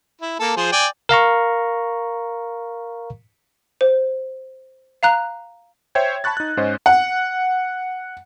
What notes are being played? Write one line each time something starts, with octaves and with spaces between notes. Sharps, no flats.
E4
A#3 A4
F3 G#4 C5
D5 G5 G#5
A#4 F5 A#5 C#6
C5
F5 A#5 F#6
C5 C#5 E5 G5 G#6
A5 B5 C#6 F#6 A6
D#4 F#6
G#2 C#4 C5 D#5
F#5